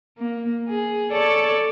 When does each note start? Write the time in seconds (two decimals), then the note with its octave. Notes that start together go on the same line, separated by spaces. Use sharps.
0.18 A#3
0.69 G#4
1.12 A4 C#5 D5